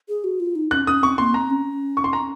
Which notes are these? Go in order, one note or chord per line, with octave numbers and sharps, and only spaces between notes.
G#4
F#4
F4
D#4
C#4 F#6
C#4 D#6
C4 C#6
A#3 C6
C4 A#5
C#4
C#6
C6
A#5